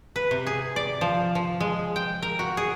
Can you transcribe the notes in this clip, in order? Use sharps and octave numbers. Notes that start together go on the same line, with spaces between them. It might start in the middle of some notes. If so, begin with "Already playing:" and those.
B4
C3
G#4
D5
F3
F3
G#3
G5
A#4
F#4
G#4